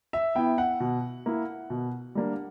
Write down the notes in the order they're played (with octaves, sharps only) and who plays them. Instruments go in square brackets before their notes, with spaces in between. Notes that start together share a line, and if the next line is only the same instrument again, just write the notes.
[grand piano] E5
B3 E4 G5
F#5
B2
A#3 E4
B2
G3 A#3 D4